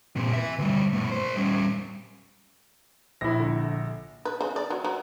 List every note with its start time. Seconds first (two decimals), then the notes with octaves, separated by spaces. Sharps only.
0.16 A#2 C4
0.33 B4 E5
0.59 D2 G3
0.93 B2 A3
1.11 A#4 C5
1.36 G3 C#4
3.21 A#1 E4 A#6
3.40 D3
4.25 B4
4.41 C#3
4.56 D5
4.70 F#3
4.84 F#3